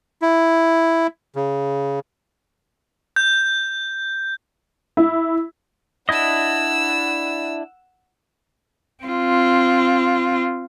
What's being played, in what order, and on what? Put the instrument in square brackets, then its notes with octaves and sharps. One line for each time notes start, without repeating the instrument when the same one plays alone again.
[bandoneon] E4
C#3
[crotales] G6
[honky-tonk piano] E4
[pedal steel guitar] D4 E4 D#5 [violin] F#5 E6
[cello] C4 F4